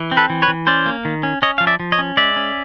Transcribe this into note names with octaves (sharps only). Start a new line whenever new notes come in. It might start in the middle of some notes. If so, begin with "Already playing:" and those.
Already playing: E3
C4
A4 B4
E3
B4 C#5
E3
C#4 C5 D5
A#3
D#3
C#4
C#4 C#5 D#5
F3 F5
D5 E5
F3
C#5 D#5
C#4
G#3 D5 E5
C#4